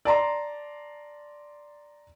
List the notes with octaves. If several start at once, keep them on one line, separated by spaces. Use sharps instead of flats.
D5 A5 A#5 C6